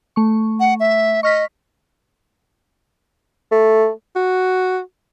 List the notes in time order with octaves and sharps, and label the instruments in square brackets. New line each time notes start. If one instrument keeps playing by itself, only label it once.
[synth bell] A3 C#6
[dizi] F#5
E5
[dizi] D#5 [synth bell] C#6 F6 B6
[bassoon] A3
[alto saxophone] F#4